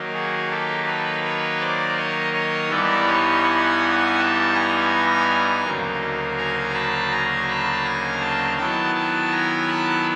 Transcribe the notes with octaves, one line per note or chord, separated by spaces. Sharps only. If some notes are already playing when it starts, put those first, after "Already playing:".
Already playing: D#3 F#3 A#3 D#4
F#4 G#4
G4 A4
A4 B4
B4 C#5
C5 D5
C#5 D#5
C#5 D#5
G2 E3 G3 B3 D#4 D5 E5
C#5 D#5
F#5 G#5
G5 A5
G#5 A#5
D2 C#3 F#3 A#3 D#4
G#5 A#5
A5 B5
G#5 A#5
A5 B5
G#5 A#5
G5 A5
D#3 F#3 B3 E4 G5 A5
G5 A5
G#5 A#5
A5 B5